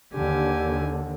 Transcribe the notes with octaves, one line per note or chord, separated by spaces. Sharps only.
D#2 D3 G4 G#5